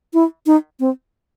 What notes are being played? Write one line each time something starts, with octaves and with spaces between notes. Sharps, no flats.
E4
D#4
C4